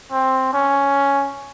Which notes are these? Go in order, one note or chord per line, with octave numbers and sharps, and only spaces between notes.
C4
C#4